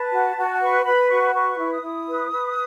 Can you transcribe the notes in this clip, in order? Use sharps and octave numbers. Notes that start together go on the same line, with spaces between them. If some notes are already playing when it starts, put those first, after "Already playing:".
Already playing: B4 A5
F#4
F#4
B4 C#6
B4 B5
F#4 C#6
B4 C#6
E4
D#6
E4
B4
B4